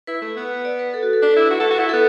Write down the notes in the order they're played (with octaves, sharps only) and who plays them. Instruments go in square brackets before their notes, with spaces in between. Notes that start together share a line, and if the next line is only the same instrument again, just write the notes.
[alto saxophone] E4 [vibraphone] B4
[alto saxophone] A3
B3
[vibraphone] D5
B4
A4
F#4
A4
[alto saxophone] D4 [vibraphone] B4
[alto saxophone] E4
F#4
A4
F#4
[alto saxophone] E4 [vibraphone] B4
[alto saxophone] B3 [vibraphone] A4